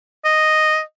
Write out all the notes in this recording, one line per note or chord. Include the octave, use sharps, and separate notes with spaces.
D#5